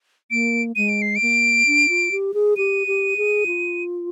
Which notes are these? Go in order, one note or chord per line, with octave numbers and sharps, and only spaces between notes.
A#3 D7
G#3 D#7
D7
C7
D7
A#3
D4
F4
G4
G#4
G4 D#7
G4
G#4
F4